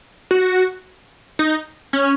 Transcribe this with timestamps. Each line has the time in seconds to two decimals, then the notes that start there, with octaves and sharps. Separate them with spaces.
0.31 F#4
1.39 D#4
1.93 C#4